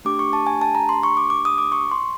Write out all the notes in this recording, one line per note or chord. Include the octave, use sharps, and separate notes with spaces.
A3 D4 G4 D6
C#6
A5
G#5
A5
A#5
C6
C#6
D6
D6
D#6
D6
C#6
C6